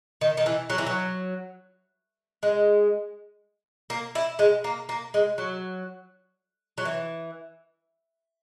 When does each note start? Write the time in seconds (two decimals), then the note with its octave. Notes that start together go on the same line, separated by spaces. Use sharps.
0.21 D#3
0.37 D#3
0.46 E3
0.70 F#3
0.78 E3
0.86 F#3
2.43 G#3
3.90 A#3
4.15 E4
4.39 G#3
4.64 A#3
4.89 A#3
5.14 G#3
5.38 F#3
6.78 F#3
6.85 E3